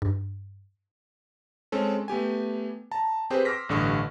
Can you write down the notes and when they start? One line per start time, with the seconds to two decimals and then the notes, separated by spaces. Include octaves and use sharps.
0.02 G2
1.72 G#3 C4 C#4 A4
2.08 A3 B3 G4 G#5
2.91 A5 A#5
3.30 C4 G4 G#4 B4 C5
3.45 C6 D6 E6 F6 A#6 B6
3.69 A1 G2 D3 A4 C#6 D#6